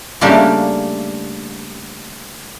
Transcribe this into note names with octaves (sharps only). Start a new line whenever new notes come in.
C#3 G3 A3 A#3 D4 G4